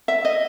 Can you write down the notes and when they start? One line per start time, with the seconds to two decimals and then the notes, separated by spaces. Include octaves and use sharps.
0.08 E5
0.25 D#5